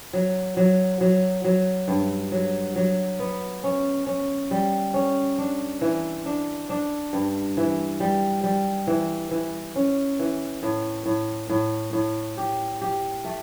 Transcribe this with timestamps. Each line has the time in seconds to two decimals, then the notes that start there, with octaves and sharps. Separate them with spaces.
0.13 F#3
0.57 F#3
1.01 F#3
1.44 F#3
1.88 G2
2.32 F#3
2.76 F#3
3.19 B3
3.64 C#4
4.06 C#4
4.51 G3
4.94 C#4
5.38 D4
5.81 E3
6.26 D4
6.69 D4
7.13 G2
7.57 E3
8.00 G3
8.43 G3
8.87 E3
9.31 E3
9.75 C#4
10.19 E3
10.63 A2
11.06 A2
11.49 A2
11.93 A2
12.37 G4
12.81 G4
13.25 A3